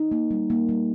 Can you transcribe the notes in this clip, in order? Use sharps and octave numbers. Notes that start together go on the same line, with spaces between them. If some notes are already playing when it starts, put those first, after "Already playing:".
Already playing: D#4
A#3
G3
A#3
G3